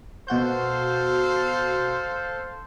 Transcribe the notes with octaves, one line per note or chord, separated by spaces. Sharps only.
B2 F#4 A4 C5 F5 G6